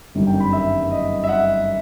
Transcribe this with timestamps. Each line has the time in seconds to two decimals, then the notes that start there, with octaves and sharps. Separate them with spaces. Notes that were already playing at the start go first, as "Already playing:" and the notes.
0.15 G1 F#2 D#3 G3
0.27 G5
0.40 B5
0.53 E5
0.91 D#5
1.24 E5
1.29 F#5